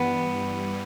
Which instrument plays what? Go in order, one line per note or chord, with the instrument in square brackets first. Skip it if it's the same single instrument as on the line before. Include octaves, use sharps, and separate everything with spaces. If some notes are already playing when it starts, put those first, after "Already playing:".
Already playing: [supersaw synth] G2 E3 G3 [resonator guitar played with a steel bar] B3